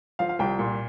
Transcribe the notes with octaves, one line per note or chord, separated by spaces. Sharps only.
F3 F5
F5
C2 G5
A#2